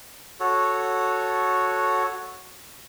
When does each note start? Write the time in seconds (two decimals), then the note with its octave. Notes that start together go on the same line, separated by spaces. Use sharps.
0.40 F#4 A4 C#5